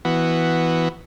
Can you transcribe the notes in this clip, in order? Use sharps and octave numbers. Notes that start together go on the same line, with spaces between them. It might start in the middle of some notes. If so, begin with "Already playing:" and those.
E3 B3 F#4